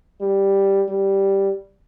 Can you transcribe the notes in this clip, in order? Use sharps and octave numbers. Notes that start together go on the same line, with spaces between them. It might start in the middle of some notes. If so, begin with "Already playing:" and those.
G3
G3